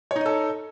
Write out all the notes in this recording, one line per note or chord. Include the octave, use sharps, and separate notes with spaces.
D#4 A4 C#5 D#5